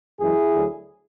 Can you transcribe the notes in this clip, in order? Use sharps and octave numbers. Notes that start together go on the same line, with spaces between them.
F#2 E3 G#3 E4 G#4
D2 D3 F#3